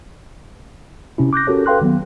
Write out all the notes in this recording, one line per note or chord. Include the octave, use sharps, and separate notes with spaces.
C3 C#4 E4
D6 F#6 G6 A#6
C#4 F#4 G4 A4 A#4 C#5
A4 B4 F5 G5 C6 F#6
D#3 F#3 B3